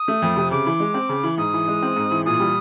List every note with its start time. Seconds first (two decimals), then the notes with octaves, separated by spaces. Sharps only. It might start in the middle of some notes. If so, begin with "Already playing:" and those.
Already playing: D#6
0.08 A3
0.22 F2
0.36 C3
0.51 C#3 D6
0.66 E3
0.80 G#3
0.94 C4
1.09 C#3
1.23 E3
1.38 G#2 D#6
1.53 E3
1.68 G#3
1.82 C4
1.96 G#2
2.11 E3
2.26 A#2 D#6
2.40 G3